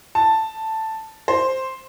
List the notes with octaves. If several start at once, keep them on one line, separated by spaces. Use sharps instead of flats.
A5
C5